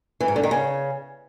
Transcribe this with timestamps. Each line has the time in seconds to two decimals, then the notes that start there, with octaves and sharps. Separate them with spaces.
0.20 E3
0.28 G#2
0.36 D3
0.43 D#3
0.51 C#3